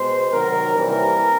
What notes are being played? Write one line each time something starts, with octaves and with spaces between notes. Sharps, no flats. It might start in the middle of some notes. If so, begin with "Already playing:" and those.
Already playing: B2 G#3 C5
C3 D#3 F#3 A#4
C3 E3 G3 A#3 A#4